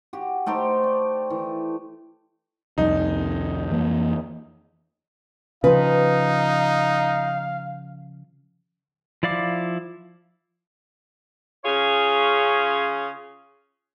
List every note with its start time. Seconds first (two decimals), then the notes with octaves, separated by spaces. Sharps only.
0.13 F#4 G4
0.46 A3 D#4 G4 C5
0.84 D5
1.30 E3
2.78 C2 F2 G3 D#4
3.71 F2 E3 A#3
5.64 C#3 F3 D#4 B4 F5
9.23 F3 E4 D5 F5 D6
11.65 C#3 C#4 F4 G#4 C#5